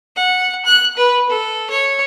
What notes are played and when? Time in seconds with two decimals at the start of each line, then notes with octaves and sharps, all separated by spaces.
0.16 F#5
0.66 F#6
0.97 B4
1.29 A4
1.70 C#5